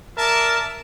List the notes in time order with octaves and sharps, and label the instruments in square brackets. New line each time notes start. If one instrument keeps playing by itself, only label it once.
[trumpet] A#4 [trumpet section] D5 E5 A5